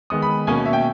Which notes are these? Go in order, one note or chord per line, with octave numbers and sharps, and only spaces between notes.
D#3 G#3 B3 D#6
B5
B2 A#3 C#4 G#5
E5
G5